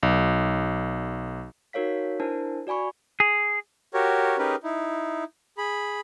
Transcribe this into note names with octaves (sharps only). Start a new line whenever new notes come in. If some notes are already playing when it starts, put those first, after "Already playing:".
B1
D#4 F#4 A#4 C#5 F5 B6
D4 E4 A#4 C5 A5
F#4 D5 G#5 B5 C#6
G#4
F#4 G4 A#4 C#5
C#4 D#4 G4 G#4 A#4 B4
D#4 E4
G#4 B5